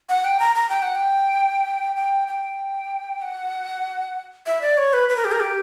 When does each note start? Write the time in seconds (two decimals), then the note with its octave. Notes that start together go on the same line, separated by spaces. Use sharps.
0.09 F#5
0.25 G5
0.40 A#5
0.55 A#5
0.69 G5
0.82 F#5
0.95 G5
1.96 G5
2.28 G5
3.22 F#5
4.46 E5
4.61 D5
4.78 C#5
4.93 B4
5.09 B4
5.16 A#4
5.25 G4
5.32 A#4
5.40 G4